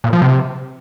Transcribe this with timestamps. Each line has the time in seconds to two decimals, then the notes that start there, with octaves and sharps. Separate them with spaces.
0.04 A#2
0.13 F3
0.22 C3